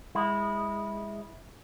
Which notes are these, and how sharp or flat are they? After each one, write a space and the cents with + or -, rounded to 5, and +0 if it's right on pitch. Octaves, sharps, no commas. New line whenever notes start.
G#3 -25 E4 -15